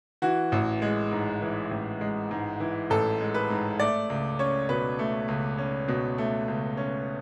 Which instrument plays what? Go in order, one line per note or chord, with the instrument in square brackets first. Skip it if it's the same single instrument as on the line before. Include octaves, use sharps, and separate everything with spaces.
[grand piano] E3 F#4
A1
G#3
G#2
E3
A1
G#3
G#2
E3
A1 A4
G#3
B4
G#2
A3 D5
C#2
C#4 C#5
B2 B4
A3
C#2
C#4
B2
A3
C#2
C#4